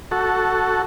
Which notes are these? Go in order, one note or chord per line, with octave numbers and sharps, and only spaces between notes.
F#4 A4